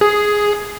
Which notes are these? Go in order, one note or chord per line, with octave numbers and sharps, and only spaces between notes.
G#4